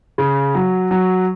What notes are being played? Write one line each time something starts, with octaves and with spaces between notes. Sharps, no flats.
C#3
F#3
F#3